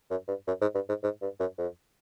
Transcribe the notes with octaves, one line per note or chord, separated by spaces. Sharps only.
F#2
G2
F#2
G#2
G2
G#2
G#2
G2
F#2
F2